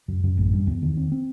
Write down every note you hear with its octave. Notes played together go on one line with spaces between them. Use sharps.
F#2
F#2
A1
G2
E2
D#3
C4
C4